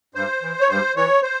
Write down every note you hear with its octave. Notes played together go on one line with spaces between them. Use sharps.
G2 C5
E3
C#5
G2 C5
E3 C#5
C5